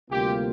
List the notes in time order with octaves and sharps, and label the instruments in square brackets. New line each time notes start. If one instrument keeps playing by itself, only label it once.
[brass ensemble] D2 C3 G3 A#3 F4 [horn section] G4